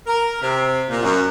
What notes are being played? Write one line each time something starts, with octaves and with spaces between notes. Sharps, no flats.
A#4
C3
A#2
F#2